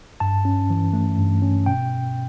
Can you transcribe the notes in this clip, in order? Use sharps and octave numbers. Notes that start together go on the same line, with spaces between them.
G2 A5
C#4
E3
A3
G2
C#4
B2 G5